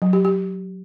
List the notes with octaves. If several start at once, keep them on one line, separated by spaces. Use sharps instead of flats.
F#3
G4
G4